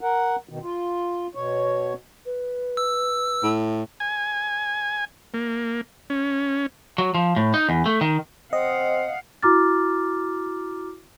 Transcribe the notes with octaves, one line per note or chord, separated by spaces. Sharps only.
A#4 F#5
B2 D#3
F4
B2 C#5
B4
E6
A2
G#5
A#3
C#4
F#3
F3
A2
D#4
E2
A3
D#3
C4 D#5 F5 F#5
E4 F#4 A#5 D6 F6 A6